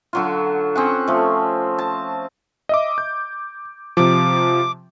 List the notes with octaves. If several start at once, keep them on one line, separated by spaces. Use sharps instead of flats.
D3 F#3 F4
C4 C#4 G#4 F#5
F3 A3
A5
D#5 E5 D6
G6
C3 F3 D6